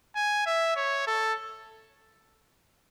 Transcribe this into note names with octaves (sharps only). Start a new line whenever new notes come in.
G#5
E5
C#5
A4